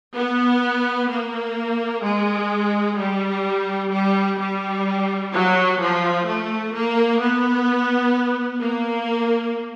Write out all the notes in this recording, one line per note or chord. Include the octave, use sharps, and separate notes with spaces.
B3
A#3
G#3
G3
G3
G3
F#3
F3
A3
A#3
B3
A#3